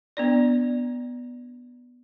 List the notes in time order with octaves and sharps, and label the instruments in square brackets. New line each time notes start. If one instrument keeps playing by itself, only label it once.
[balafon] B3 D4 D5